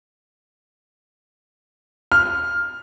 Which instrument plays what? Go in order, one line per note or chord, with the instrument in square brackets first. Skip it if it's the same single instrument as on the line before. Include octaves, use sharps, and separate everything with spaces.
[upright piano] F6